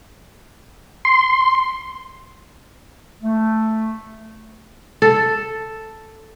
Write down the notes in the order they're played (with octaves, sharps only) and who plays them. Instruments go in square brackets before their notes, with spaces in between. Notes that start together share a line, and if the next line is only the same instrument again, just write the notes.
[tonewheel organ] C6
[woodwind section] A3
[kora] A4